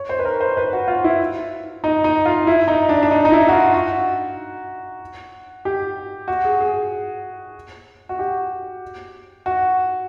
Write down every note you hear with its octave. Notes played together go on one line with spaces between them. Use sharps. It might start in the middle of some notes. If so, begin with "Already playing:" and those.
Already playing: C#5
C5
B4
A#4
C5
B4
F#4
F4
E4
D#4
D#4
F4
E4
D#4
D4
D4
D#4
D#4
E4
F#4
F4
F#4
G4
F#4
G#4
G#4
F#4
G4
F#4